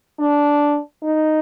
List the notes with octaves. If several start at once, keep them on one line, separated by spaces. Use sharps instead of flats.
D4
D#4